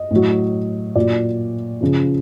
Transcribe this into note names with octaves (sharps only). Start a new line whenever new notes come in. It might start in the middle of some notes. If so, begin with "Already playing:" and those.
Already playing: D#5
A2 F#3
A#2 F#3 D5
C#3 F3